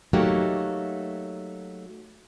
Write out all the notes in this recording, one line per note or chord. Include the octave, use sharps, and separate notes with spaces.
F#3 A3 A#3 D#4 F#4 G4